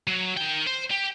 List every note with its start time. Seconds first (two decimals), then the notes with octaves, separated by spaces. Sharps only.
0.07 F#3
0.37 D#3 G5
0.67 C5
0.91 G4